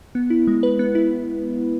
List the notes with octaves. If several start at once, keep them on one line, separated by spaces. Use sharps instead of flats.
B3
E4
G#3
B4
B3
E4